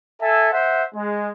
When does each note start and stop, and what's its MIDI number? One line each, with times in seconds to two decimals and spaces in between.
0.20 0.48 69
0.20 0.48 76
0.20 0.48 80
0.51 0.82 72
0.51 0.82 76
0.51 0.82 78
0.94 1.30 56